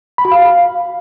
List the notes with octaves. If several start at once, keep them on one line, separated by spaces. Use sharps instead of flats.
B5
F#4
F5